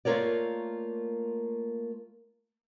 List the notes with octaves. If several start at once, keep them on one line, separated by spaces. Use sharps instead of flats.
A3 A#3 F4 A#4 C#5 D5